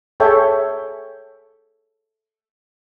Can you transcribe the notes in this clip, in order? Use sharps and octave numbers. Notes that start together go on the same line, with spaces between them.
G#4 A4 C#5 E5 G5